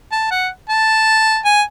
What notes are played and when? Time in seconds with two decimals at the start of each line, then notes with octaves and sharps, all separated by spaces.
0.12 A5
0.31 F#5
0.69 A5
1.45 G#5